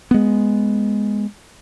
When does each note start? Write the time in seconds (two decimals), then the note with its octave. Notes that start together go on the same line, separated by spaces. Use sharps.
0.11 G#3 B3